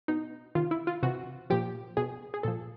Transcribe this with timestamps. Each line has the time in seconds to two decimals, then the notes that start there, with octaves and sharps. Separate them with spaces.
0.08 B2 D#4
0.55 C3 D#3 F4
0.71 E4
0.87 F4
1.03 C3 E3 F#4
1.50 A#2 F3 G4
1.97 B2 G#4
2.34 G#4
2.43 A#2 F3 A4